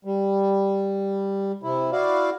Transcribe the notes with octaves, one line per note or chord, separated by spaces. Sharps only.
G3
C3 E4
E4 F#4 D5 F5